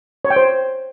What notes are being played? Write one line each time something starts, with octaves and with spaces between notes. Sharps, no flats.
C#5
G5
C5